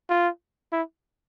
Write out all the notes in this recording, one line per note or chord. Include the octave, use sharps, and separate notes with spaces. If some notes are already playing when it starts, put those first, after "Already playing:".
F4
E4